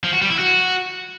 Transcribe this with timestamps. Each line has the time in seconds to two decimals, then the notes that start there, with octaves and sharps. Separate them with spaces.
0.04 F3
0.13 F#4
0.21 G3
0.30 E4
0.39 F#4